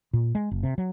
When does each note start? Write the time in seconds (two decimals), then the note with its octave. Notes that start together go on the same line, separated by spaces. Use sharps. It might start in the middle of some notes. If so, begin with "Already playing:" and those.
0.13 A#2
0.35 G#3
0.51 F#1
0.63 C3
0.78 F#3